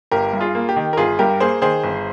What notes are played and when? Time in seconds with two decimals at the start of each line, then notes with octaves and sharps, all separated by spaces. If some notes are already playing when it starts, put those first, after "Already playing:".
0.11 G1 G4 A#4
0.33 G2
0.40 F4 G#4
0.55 A#3
0.69 G4
0.76 D#3
0.93 A#4
0.97 G1 F4 G#4
1.19 G2 G4 A#4
1.40 A#3 G#4 C5
1.62 D#3 G#4 C5
1.84 G1